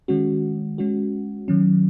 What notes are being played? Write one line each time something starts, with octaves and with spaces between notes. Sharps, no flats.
D#3 G#3 C#4 F#4
G#3 C#4 F#4
D#3 F#3 C#4